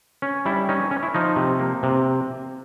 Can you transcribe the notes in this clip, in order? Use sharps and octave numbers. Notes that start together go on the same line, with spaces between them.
C#4
G3 E4
C#4 D#4
C#4
E4
F3 D#4
C3
A#3
C3